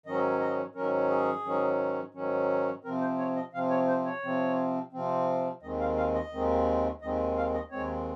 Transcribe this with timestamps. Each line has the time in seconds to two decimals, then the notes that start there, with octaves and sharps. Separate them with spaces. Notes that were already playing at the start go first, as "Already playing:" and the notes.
0.06 G#2 D#3 F#3 C#4 D#5
0.40 D#5
0.75 G#2 D#3 F#3 C#4 A#4
1.10 G#4
1.45 G#2 D#3 F#3 C#4
2.14 G#2 D#3 F#3 C#4
2.84 C3 F3 C4 A#4
3.01 C5
3.18 C#5
3.36 D#5
3.53 C3 F3 C4 F5
3.70 C#5
3.88 C5
4.06 C#5
4.23 C3 F3 C4
4.92 C3 F3 C4
5.62 D#2 D#3 G#3 C4 D#5
5.80 F5
5.97 F5
6.14 D#5
6.32 D#2 D#3 G#3 C4
7.02 D#2 D#3 G#3 C4 D#5
7.37 F5
7.54 D#5
7.71 D#2 D#3 G#3 C4 C#5